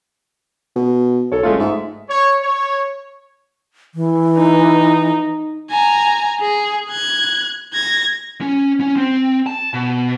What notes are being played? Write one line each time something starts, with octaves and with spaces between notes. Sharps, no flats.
B2
B1 A4 C#5
F#1 G#3 A3 F4
G#2 E5
C#5
C#5
E3
D#4
G#5 A#5
G#4
F#6 G#6
G#6 A#6
C#4
C#4
C4
A5
B2